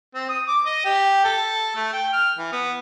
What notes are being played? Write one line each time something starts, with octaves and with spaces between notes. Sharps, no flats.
C4
D#6
D6
D#5
G4
A4
A3
G5
F6
E3
B3